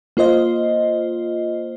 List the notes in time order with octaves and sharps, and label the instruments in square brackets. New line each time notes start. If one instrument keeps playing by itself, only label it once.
[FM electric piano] A#3 F4 C5 D#5